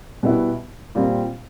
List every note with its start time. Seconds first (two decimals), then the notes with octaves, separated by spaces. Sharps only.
0.23 B2 G3 B3 E4
0.95 A#2 G3 C4